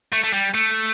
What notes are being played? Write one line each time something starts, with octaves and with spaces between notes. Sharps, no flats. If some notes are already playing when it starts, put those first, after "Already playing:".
A3
A3
G3
A3